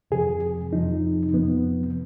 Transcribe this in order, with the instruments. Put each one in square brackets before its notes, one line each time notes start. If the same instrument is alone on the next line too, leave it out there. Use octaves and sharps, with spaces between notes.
[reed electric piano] F2 C3 F3 G#4
F2 C3 F3 D#4
F2 C3 F3 B3